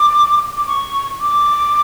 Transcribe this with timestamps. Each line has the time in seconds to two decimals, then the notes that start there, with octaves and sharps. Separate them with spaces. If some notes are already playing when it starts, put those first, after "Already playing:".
Already playing: D6
0.57 D6
0.67 C#6
1.21 D6